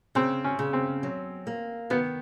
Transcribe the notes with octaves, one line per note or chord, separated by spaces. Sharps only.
C#3 C4
C#4
C#3
C4
F#3
A#3
D#3 B3